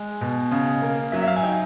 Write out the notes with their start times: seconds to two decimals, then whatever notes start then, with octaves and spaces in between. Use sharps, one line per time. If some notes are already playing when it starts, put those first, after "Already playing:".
Already playing: G#3
0.21 B2
0.52 C#3
0.82 A#3
1.12 F#3 E5
1.22 E5
1.27 F5
1.36 G#5
1.42 D#4 G5